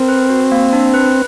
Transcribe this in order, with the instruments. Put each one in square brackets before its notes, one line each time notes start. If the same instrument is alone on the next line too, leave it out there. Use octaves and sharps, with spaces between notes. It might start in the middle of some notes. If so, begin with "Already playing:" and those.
Already playing: [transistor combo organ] C4 [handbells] A#4
[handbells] B4
F#4
A#3
D4
B4